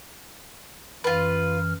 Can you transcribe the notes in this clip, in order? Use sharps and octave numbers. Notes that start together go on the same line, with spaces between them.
F#2 E3 F4 B4 F6